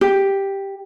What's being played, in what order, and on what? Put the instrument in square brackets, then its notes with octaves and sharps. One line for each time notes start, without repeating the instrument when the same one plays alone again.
[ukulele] G4